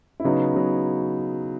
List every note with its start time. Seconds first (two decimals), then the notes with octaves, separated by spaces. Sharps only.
0.20 E4
0.24 C#3 F#3 B3 D#4
0.54 C#3 F#3 B3